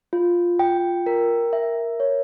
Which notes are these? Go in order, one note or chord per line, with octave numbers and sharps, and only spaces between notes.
F4
G5
A#4
E5
C#5